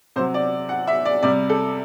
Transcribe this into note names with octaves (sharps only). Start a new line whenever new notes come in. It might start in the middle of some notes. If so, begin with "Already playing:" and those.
C3 F#3 C5
D5
F#5
E5
D5
C3 G3 D5
A4